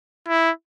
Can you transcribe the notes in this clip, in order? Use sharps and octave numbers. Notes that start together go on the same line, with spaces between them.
E4